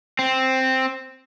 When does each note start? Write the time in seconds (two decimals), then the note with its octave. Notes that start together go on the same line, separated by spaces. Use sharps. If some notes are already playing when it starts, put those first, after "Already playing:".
0.19 C4